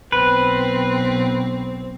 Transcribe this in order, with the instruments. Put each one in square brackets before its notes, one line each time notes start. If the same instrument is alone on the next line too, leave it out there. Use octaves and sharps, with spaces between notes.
[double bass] B1 [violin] C4 [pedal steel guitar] B4